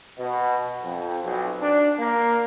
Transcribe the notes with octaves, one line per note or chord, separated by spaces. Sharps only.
B2
F2
B1
D4
A#3